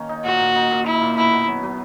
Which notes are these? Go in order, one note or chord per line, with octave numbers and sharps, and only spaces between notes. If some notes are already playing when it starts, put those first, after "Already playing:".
Already playing: D#3 A#3 C#4
D#4
A#2 F#4
A#2
D#4
A#2
D#4 E4
A#2
B2 E4
B3
F#3
F#3